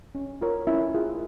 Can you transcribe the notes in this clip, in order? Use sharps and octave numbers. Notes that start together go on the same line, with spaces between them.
C#4
F4 A#4 C#5
C#4 E4 E5
F4 G#4